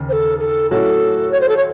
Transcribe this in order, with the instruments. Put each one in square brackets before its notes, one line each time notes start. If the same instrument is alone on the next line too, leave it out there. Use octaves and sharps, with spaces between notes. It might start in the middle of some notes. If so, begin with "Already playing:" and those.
Already playing: [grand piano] D#2 C#3
[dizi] C5
A4
A4
[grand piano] A2 F#3 C#4 F#4 [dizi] A4
[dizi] C#5
C5
A4
C#5